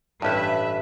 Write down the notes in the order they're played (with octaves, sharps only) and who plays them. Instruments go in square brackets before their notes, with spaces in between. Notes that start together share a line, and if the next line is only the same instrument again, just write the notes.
[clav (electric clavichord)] A1 G2 [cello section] B4 E5